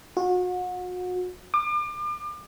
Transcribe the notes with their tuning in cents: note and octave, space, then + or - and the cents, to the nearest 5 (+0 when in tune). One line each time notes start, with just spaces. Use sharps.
F#4 -35
D6 +35